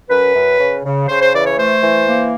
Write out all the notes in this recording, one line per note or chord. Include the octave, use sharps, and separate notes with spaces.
F#2 B4
F#2
C#3
C#3
C#3 C5
C5
E3 D5
C#5
A3 C5
E3
A#3